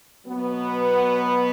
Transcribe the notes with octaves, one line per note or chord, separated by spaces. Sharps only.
B2 F#3 B3